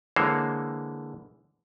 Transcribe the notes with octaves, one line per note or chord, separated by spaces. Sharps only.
D3 E3 G#3 A#3 C5 C#5